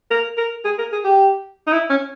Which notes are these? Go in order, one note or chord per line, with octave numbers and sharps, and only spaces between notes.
A#4
A#4
G#4
A#4
G#4
G4
D#4
E4
C#4